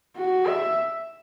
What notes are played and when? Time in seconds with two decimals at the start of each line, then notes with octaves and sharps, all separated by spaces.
0.16 F#4
0.48 E5